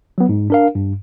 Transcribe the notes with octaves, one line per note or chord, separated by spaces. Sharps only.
F#3 B3
G#2
D4 A#4 F5
G2